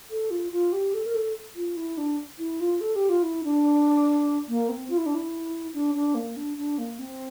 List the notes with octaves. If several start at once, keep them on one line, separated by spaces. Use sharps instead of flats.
A4
F4
F4
G4
A4
A#4
A4
F4
E4
D4
E4
F4
A4
G4
F4
E4
D4
A#3
C4
F4
E4
D4
E4
D4
D4
A#3
D4
D4
A#3
C4